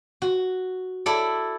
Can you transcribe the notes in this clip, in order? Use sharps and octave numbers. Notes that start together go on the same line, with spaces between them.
F#4
E4 A4 D5